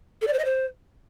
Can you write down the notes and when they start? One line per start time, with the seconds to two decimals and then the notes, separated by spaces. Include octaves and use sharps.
0.21 A4
0.27 D5
0.33 C5
0.39 D#5
0.45 C5